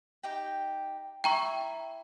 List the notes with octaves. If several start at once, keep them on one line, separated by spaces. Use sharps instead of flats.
D#4 G4 G5
E4 E5 G5 A#5 C#6